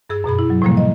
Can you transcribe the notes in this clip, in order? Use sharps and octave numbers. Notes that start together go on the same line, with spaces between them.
G2 G#4 E6
F#2 B2 G#4 B5
E4
F#3
A2 C3 F3 G3 A#3
D#5